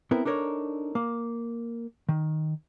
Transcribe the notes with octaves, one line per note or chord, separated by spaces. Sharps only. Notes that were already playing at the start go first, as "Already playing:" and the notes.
B3 C4 E4 A#4
D4 D#4 A4 A#4 C#5
A#3
D#3